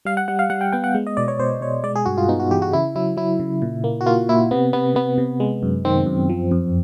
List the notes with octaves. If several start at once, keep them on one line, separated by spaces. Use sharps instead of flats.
G3 F5
F#5
G3 F#5
F5
G3 F#5
G5
B3 G5
F#5
G#3
D#5
B2 D5
C#5
B2 C5
B2 C#5
G#3 D5
G#4
G2 F#4
F4
B3 D#4
F#4
E3 G4
F#4
C#3 E4
F#3 E4
F#3 E4
C#3
A#2
A#3
F#4
A#3 F4
A#2 E4
C3 B3
C3 B3
C3 B3
C3
G#3
F#2
D#3 C4
F#2
F3
F2